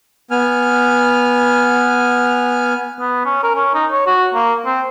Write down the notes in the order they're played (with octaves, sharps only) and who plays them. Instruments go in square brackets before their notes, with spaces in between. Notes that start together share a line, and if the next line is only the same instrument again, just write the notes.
[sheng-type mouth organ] B3 G#5 F6
[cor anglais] B3
C#4
A#4
C#4
D#4
C#5
F#4
A#3
C4